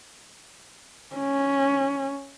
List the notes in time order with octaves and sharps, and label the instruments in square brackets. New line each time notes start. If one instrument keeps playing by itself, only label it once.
[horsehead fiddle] C#4